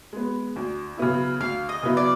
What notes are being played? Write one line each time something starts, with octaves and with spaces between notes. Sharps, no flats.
G#3 B3
D2
C#3 F#3 B3 E4
D2 F5
D#5
C#3 F#3 B3 E4
D5